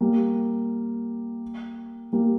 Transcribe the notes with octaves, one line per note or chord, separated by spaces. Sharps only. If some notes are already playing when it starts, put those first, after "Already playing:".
G3 A#3
G3 A#3